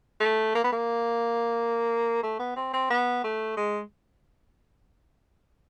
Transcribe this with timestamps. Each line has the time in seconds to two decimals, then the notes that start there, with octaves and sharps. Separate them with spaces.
0.20 A3
0.55 A#3
0.64 B3
0.72 A#3
2.23 A3
2.39 B3
2.56 C4
2.73 C4
2.90 B3
3.24 A3
3.57 G#3